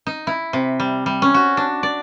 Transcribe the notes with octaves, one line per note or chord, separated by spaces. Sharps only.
D#4
E4
C3
G3
G3
C#4
F#4
D4
D5